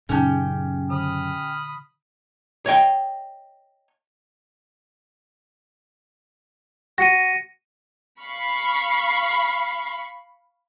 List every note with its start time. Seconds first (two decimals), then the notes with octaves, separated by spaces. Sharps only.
0.09 F#2 A#2 C#3 C#4 D#4 G4 A5 G6
0.90 D3 B5 D#6 F6
2.66 C#5 D#5 G5
6.98 F#4 A#6 C#7 D#7
8.21 F5 B5 C#6